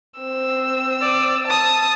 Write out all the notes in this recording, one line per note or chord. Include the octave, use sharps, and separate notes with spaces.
C4 E6
D5
A5 D#6